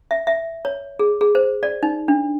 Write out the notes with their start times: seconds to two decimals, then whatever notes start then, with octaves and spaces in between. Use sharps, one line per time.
0.11 E5
0.27 E5
0.65 C#5
0.99 G#4
1.21 G#4
1.35 C5
1.63 D5
1.83 D#4
2.08 D4